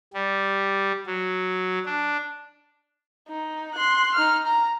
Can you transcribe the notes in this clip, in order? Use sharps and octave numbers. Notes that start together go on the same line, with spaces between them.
G3
F#3
D4
D#4
C6 F#6
D#4 F6
A#5